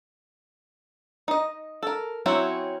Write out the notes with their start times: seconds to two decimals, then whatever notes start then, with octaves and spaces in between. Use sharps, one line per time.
1.28 D#4 D#5
1.83 A4 A#4
2.26 F#3 C4 C#4 E4 F#4